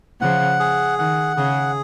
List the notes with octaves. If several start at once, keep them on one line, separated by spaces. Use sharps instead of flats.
C#3 F3 F#5
G#4
D#3 F#5
C#3 G#4